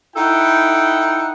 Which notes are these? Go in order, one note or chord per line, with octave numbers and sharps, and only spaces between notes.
D#4 E4 A4 F#5 G5